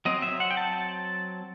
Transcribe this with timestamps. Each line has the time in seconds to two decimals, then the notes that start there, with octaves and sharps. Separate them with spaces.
0.05 F#3 C4 D#5
0.22 E5
0.40 F#5
0.51 G5
0.57 A5